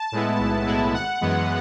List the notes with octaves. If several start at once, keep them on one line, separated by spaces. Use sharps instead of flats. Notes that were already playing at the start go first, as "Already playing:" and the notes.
Already playing: A5
A2 G#3 B3 E4
B1
A2 G#3 B3 E4
G#1 F#5
F#2 E3 G#3 B3